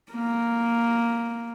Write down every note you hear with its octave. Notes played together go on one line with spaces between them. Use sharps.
A#3